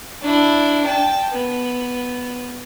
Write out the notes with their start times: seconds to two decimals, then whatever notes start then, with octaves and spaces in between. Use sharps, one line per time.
0.21 D4 E4
0.85 G5 A5
1.31 B3